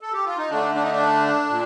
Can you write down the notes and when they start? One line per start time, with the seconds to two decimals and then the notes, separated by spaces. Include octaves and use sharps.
0.00 A4
0.13 G4
0.25 F4
0.38 D#4
0.50 D3 A3 D4
0.75 D4
0.83 D#4
0.91 D4
1.50 A#2